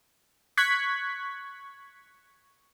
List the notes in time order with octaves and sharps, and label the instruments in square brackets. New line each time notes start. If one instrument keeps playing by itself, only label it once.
[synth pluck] C#6 F#6 G#6 B6